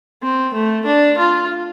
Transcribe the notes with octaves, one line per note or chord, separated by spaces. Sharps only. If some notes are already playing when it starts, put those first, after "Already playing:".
C4
A3
D4
F4